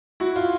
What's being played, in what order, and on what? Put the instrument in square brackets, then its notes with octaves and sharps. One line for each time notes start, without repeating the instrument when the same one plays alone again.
[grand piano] E4 F#4
F4